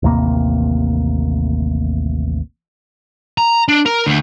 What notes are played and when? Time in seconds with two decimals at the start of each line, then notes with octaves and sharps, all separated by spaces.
0.03 A1 D#2 C3 A#3
3.38 A#5
3.68 D4
3.86 A#4
4.07 D2